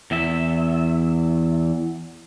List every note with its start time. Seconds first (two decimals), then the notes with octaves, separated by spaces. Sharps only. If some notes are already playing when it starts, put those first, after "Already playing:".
0.11 E2 E5